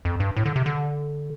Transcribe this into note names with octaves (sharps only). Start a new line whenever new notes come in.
F2
G2
A2
D3
C3
D3